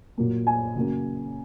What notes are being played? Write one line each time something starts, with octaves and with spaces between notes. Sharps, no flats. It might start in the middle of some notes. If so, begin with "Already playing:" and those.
A#2 F#3 A#3
G#5
C#3 F#3 A#3